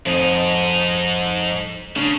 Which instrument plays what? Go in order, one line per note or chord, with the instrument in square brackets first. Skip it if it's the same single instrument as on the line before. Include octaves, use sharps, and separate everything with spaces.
[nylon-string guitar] F2 [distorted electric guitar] G#2 D#4
[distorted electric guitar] C#3 [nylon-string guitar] D4